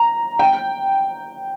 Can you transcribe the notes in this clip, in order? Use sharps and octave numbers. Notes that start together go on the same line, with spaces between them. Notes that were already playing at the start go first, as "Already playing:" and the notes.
Already playing: A#5
G5